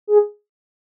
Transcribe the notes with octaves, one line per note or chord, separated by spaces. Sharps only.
G#4